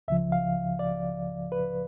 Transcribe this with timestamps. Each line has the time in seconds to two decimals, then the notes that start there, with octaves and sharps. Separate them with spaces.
0.08 C#2 C#3 F3 E5
0.32 F5
0.79 D5
1.52 B4